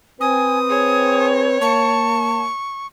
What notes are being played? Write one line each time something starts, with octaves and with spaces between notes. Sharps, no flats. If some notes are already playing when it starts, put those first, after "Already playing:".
C4 B4 G#5 D#6
G#4 C#5
A#3 A5 C#6